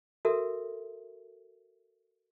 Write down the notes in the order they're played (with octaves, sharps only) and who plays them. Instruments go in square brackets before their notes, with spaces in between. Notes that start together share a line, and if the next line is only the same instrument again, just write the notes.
[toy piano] F#4 A4 A#4 E5